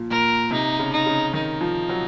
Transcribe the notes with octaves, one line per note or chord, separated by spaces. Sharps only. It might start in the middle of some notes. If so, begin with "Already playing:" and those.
Already playing: A#2 F3
A#2 A#4
C3 D#4
C#3
D#4
C#3
D#3 D#4
F3
F#3